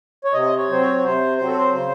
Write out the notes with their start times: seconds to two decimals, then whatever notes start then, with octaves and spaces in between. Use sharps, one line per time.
0.24 C#5
0.34 C3 D#5
0.58 C#5
0.69 F#3 C4 C5
0.81 C#5
0.98 C#5
1.04 C3 C5
1.38 F#3 C4 C5
1.48 A4
1.57 C5
1.73 C#3 C5